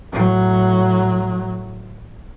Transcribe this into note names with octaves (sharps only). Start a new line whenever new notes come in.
A2 F#3